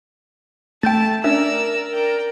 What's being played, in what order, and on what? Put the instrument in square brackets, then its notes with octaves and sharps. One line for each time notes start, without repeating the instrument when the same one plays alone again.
[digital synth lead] A3 [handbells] G5 G6 A6 [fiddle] A5
[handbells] C#4 D4 E5 [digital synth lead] A#4 [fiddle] D5 E6
[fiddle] D5 G5